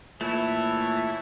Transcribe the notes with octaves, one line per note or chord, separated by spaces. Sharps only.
A#2 E3 A3 E4 A4 C#5 E5